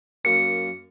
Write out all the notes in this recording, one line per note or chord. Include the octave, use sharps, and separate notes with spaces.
F#2 A#3 C#7